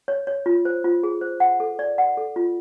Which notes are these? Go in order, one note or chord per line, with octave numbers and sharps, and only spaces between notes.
C#5
C#5
F4
C5
F4
G#4
C5
F#5
A4
D5
F#5
A4
F4